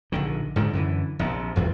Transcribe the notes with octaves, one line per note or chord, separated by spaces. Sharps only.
A#1 D3 D#3
G#2 D3 D#3
F#2 D3 E3
A#1 D#2 C3
F1 E2 G3